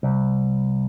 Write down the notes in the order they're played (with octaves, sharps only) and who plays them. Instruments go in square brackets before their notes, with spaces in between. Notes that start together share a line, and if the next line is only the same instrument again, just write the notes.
[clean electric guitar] C2